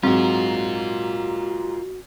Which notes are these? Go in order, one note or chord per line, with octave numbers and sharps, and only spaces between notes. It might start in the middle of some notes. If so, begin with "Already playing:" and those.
G#2 F#3 C4 F4 F#4 A#4